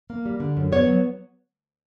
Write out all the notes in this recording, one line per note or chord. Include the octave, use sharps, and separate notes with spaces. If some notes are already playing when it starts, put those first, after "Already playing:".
A#3
G3
D3
F#2
B3 C#5
F#3